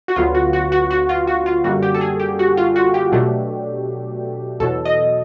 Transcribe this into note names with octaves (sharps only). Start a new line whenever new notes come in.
F#4
D2 D3 F#3 B3 F4
F#4
F#4
F#4
F#4
F4
F#4
F4
F#2 D3 G3 A#3 F#4
G4
A4
G#4
G4
F#4
F4
F#4
G4
B2 F#3 A3 D4
E2 B2 F#3 A4
D#5